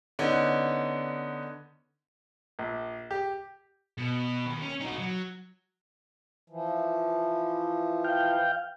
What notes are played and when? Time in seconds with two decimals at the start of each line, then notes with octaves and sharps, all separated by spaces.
0.19 D3 B3 C#4 D#4
2.59 A#1
3.11 G4
3.98 B2
4.46 D#2
4.62 C#4
4.81 D#4 F#4
4.99 F#3
6.50 E3 F3
8.04 F5 G5